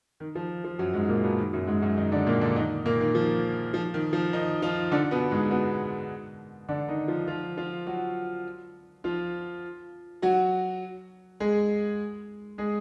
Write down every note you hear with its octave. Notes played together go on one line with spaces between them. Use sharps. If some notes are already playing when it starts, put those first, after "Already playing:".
D#3
F3
F3
F#2 F#3
G#2 G#3
A#2 A#3
B2 B3
D#3
F#2 F#3
G#2 G#3
F#2 F#3
D#3 D#4
D3 D4
A#2 A#3
D3 D4
D#3 D#4
A#2 A#3
D#3
F3
F3
D#3
F3
D#3 D#4
F3 F4
D3 D4
B2 B3
G#2 G#3
B2 B3
D3 D4
D#3 D#4
F3 F4
F3 F4
F3 F4
F#3 F#4
F3 F4
F#3 F#4
G#3 G#4
G#3 G#4